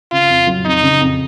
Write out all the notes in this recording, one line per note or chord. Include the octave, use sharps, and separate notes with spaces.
C#3 F4
F2
F#3
F2 D#4
C#3
F2